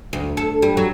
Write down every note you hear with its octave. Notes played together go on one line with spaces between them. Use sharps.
D2
A4
G3
F#3